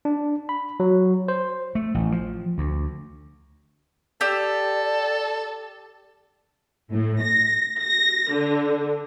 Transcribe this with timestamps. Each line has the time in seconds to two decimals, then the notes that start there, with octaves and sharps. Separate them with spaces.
0.05 D4
0.49 B5
0.80 F#3
1.28 C5
1.75 A3
1.94 A1
2.12 F3
2.58 D2
4.21 G4 A4 D5 E6
6.92 A2
7.21 A#6
7.80 A#6
8.32 D3